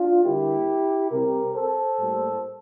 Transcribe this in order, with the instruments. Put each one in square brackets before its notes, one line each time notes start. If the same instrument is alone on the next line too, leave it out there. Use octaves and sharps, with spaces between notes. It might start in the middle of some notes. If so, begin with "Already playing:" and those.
Already playing: [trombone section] D4 F4
D3 G3 A#3 E4 G4
C3 G3 C4 G4 A#4
A4 C5
A2 G3 A#3